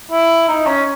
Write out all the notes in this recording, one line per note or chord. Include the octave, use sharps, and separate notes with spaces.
E4
D#4
C#4